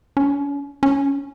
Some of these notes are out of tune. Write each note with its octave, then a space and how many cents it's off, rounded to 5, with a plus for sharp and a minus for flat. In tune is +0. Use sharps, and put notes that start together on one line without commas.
C#4 +40
C#4 +10